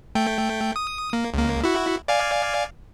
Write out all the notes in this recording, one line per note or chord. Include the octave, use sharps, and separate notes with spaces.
A3 G5
D#6
A#3
C#2 A#3
E4 F#4
D5 F5 G#5